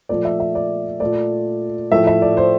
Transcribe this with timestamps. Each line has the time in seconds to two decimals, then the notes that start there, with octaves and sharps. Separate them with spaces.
0.09 A#2 F3 A3 D5
0.25 E5
0.40 E5
0.55 D5
1.00 A#2 A3 D5
1.92 A2 F3 A3 E5
2.07 E5
2.22 D5
2.37 C5